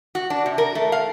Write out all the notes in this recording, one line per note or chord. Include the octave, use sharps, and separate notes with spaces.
F#4
D4
C3
A#4
A3
F5